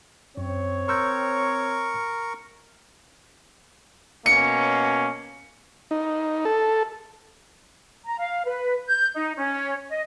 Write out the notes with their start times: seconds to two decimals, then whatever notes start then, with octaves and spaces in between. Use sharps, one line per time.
0.37 F#2 C4 C#5
0.88 A#4 C6 C#6 E6 G6
4.26 B2 A#3 C#4 C#7
5.91 D#4
6.45 A4
8.05 A#5
8.18 F5
8.45 B4
8.87 G6
9.14 D#4
9.37 C#4
9.89 D#5